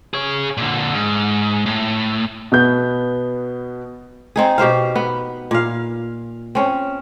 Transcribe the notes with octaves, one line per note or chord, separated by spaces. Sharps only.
G#4 C#5
A#2 D3
G#2
A2
B2 B3 G6
C4 D#4 G#4
B2 G4 C5 F5
B3
A#2 F5
C4 C#4